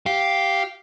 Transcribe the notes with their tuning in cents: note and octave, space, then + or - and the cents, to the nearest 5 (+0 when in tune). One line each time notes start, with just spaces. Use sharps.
G4 -5 F5 +0